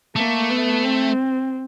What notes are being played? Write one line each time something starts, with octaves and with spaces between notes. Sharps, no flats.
A3 A#3
B3
C4